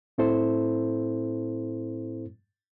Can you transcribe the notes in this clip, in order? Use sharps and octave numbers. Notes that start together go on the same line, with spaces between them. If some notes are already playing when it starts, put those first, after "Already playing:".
A2 C4 E4 A4 C5